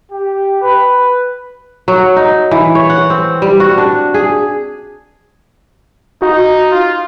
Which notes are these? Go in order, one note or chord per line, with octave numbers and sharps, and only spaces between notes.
G4
B4
F#3
D#4
E3
C#5
F#5
C4
G3
F#4
D4
G#4
D#4 F#4
F4